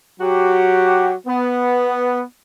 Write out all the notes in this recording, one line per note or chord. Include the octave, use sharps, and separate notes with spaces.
F#3 F#4 G4
B3